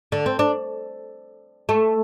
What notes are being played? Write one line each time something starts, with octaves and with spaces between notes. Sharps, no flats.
D3
C4
D4
A3